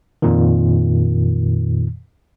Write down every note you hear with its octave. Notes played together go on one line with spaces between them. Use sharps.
F2 A#2 D#3